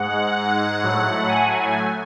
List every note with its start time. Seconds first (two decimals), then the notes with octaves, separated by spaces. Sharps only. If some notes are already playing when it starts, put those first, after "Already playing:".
Already playing: G#2 G#3 F#5
0.83 A2 F#3 A3
1.29 G#5